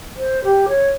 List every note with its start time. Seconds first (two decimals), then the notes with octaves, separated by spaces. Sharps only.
0.17 C5
0.45 G4
0.69 C#5